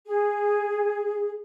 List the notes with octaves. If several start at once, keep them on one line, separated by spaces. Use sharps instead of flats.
G#4